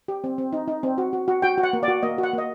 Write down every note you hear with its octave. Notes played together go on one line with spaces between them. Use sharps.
G4
C4
C4
D#4
D#4
C4
F#4
F#4
F#4
F#4 G5
F#4
F#5
A#3
D5
F#4
A#3 D#5
F#4
F#5
A#3 D#5